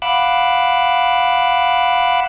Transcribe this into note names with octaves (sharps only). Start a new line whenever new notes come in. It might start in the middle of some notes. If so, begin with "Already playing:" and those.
F5 F#5 B5 D6 E6 F#6